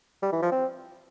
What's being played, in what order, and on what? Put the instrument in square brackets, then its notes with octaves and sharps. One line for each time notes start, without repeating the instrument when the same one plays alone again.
[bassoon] G3
E3
F3
C4